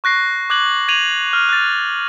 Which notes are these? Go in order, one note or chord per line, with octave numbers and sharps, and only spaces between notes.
C#6 F#6 A#6 C7
D6 F#6 G#6 F#7
G#6 D#7 F7 F#7
F6
F#6 A6